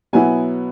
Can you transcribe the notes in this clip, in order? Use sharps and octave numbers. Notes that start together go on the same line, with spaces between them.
B2 F#3 B3 E4 G#5